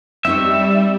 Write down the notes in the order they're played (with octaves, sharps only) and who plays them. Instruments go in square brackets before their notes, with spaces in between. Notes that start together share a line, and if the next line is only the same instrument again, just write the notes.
[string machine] G3 [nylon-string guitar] C4 D#4 C#5 [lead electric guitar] E5